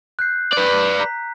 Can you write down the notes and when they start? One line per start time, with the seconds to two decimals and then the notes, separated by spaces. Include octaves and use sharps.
0.19 F#6 G6 C7
0.53 B4 D5
1.00 A#5 B6